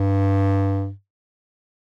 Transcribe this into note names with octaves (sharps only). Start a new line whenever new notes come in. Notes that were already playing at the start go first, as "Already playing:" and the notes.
Already playing: G2